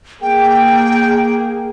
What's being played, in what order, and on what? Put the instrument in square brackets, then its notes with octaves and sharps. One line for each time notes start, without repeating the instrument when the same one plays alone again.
[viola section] A#3 G#4 [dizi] G5